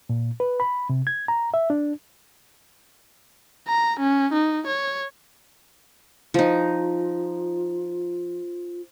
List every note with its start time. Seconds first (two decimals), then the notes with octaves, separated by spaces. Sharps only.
0.09 A#2
0.40 B4
0.60 B5
0.90 C3
1.07 G#6
1.28 A#5
1.54 E5
1.70 D4
3.68 A#5
4.00 C#4
4.33 D#4
4.67 C#5
6.34 F3 D#4 F4